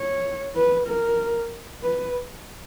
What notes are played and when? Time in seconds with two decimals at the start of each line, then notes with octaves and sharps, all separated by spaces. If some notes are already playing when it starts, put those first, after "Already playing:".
Already playing: C#5
0.56 B4
0.87 A#4
1.83 B4